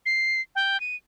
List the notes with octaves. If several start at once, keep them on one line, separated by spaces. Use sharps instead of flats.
C7
G5
D#7